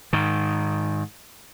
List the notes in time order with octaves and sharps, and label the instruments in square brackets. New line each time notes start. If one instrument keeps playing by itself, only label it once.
[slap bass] G#2 D#3